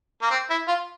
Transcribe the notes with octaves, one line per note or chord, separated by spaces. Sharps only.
A#3
C4
E4
F4